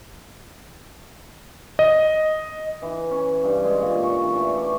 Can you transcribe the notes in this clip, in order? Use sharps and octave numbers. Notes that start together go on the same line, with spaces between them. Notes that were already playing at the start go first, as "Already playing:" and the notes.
D#5
E3
C#4
G2
G#3
A#2
C#6
E3
A3
D6